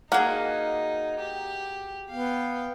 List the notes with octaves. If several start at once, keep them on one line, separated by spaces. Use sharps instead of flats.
A#3 D#4 F#4 G#4
G4
B3 F5 G5